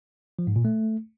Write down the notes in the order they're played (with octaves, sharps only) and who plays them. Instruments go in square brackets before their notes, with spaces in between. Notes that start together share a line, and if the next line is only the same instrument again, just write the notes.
[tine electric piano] F3
G#2
A#2
A3